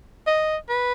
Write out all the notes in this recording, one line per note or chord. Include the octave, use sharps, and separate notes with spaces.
D#5
B4